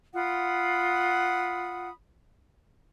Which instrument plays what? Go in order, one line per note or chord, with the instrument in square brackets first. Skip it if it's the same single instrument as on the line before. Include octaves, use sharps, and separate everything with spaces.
[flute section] F4 F#5 B5 D#6